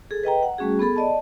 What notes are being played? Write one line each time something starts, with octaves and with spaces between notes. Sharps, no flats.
G#4 A4
B4 D#5 G5 A#5
F#5
G3 A3 C#4 F#4 G#4
B3 G#4 A4 B5
D5 D#5 A5